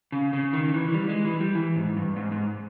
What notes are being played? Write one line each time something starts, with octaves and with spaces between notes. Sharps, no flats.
C#3
C#3
D#3
E3
E3
G3
G#3
E3
G3
E3
G#2
G2
G#2
G#2